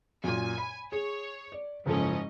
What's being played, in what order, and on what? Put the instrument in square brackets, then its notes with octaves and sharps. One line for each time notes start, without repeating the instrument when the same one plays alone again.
[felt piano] F#2 A#2 [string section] G#5
[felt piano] B5
[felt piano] G#4 [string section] C#5
[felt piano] D5
[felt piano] F#1 F3 A4 [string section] G#2 C#4 D#5